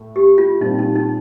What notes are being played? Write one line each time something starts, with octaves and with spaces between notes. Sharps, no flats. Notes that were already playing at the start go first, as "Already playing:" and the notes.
Already playing: A2 A3
G4
F4
A#2 G3 C4 D#4 G4
D#4
D#4